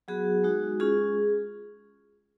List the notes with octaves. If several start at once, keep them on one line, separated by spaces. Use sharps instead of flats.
F#3 B3 F#4 G#4
G#3 D#4 F#4
G#3 C#4 F4 G#4